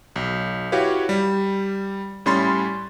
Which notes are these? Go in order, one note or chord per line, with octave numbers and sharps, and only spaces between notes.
B1
E4 F#4 G4 B4 C#5 F5
G3
A2 G3 C#4 B5 C6 A6